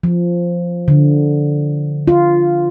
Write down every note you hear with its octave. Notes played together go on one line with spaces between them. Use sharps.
F3
D3
F4